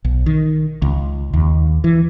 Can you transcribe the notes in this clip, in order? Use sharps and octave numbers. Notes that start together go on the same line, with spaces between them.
B1
D#3
C#2
D#2
E3